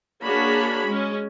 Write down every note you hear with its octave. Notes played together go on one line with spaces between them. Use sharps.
A#3 D4 F#4 G#4 C#5 B5
G#3 C#4